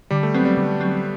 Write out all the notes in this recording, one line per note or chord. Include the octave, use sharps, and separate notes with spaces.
D3 G3
A3
F#3 B3 C4
G3
D3
F#3 C4